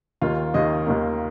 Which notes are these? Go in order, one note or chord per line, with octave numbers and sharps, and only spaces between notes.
D#2 D#3 A#3 F4 F5
D#2 D#3 A#3 D#5
D#2 D#3 A#3